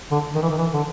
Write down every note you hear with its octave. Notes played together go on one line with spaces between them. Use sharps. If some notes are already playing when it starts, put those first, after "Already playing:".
D3
D#3
E3
D#3
E3
D3